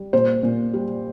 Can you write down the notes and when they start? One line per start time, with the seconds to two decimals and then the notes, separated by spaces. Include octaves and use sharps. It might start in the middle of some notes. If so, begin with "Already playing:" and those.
Already playing: G3
0.13 A#2 C5
0.43 A#2
0.73 G3